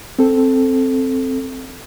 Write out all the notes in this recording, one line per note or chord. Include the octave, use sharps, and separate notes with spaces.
C4 A4